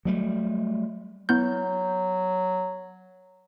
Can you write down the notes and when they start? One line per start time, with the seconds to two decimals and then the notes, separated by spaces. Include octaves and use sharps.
0.05 F#3 G3 A3
1.29 F#3 B3 E4 G6